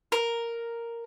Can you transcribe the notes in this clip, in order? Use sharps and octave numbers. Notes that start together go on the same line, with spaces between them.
A#4